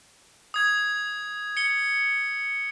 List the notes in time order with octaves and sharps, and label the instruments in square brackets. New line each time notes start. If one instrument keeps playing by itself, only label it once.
[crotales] D#6 G#6
C#7 G7